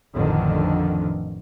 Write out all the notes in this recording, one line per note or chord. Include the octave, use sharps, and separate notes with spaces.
A1 F2 D3 D#3